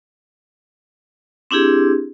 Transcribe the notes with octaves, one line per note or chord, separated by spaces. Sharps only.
C4 D4 E4 G4 G#4